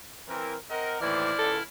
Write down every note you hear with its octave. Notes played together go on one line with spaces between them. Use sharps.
E3 C4 A#4
C4 A#4 D#5 F#5
D#2 A2 E3 E4 C5 D5 F6
C#2 A4